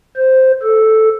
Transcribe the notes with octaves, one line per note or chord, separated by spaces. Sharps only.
C5
A4